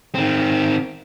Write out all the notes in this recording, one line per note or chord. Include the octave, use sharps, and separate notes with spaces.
D#3 C4